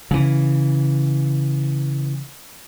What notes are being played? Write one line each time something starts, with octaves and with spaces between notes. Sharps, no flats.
C#3 E3